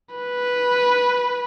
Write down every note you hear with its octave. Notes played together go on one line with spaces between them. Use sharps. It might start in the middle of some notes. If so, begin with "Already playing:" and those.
B4